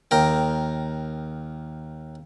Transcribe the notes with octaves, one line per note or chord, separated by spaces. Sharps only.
D#2 A#4 G5